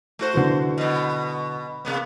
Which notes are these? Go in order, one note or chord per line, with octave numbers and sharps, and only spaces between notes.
A3 F#4 C5
D3 E3 F#3
B2 B3
C3 A#3 B3